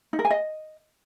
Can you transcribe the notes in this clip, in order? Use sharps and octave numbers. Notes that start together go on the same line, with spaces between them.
D#4
A#4
G#5
D#5